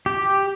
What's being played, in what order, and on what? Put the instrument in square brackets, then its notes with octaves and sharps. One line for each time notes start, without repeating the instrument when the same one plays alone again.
[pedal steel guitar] G4